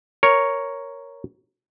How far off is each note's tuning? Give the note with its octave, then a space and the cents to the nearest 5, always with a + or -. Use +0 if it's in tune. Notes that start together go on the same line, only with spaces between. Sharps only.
A#4 +0 C#5 +0